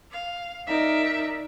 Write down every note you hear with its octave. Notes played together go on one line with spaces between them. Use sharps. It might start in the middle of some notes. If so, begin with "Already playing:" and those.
F5
D#4 A#4 D5 E5